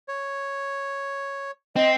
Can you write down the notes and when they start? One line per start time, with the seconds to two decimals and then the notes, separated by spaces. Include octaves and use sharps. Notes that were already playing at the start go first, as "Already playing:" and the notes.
0.08 C#5
1.76 C4 D#5